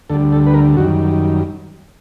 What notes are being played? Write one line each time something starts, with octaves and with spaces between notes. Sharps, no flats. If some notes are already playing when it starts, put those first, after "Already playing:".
D2 D3 G3 A4
A4
B4
A#4
F#2 D#3 G3 F#4